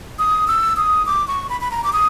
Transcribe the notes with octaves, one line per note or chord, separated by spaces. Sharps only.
D#6
E6
D#6
D6
C#6
B5
B5
A#5
D6
D#6